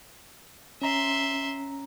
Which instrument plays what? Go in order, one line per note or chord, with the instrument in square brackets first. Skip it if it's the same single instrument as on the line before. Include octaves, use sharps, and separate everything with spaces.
[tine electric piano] C#4 A#5 [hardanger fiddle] E5 C6